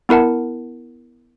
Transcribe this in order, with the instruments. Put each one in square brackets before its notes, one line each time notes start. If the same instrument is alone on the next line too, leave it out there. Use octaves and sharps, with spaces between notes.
[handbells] B3 E4 A#4 F#5 A5